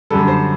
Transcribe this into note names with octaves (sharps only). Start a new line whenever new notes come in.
F#2 D3 G3 A4
C5